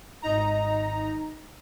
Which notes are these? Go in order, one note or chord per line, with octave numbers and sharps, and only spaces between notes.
G#1 D#4 A#5